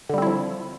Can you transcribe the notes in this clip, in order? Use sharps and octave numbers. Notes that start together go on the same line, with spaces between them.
D3 F3 G3 C4 E4